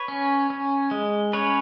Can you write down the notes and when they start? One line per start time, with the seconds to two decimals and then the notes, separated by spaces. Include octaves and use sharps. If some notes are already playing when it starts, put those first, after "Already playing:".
Already playing: B4 C#5
0.08 C#4
0.50 C#4
0.91 G#3
1.33 C#4 B4 C#5